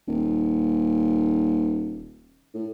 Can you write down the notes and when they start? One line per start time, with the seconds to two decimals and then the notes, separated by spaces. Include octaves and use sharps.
0.08 D#1
2.55 A2